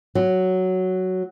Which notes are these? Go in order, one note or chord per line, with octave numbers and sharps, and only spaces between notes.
F#3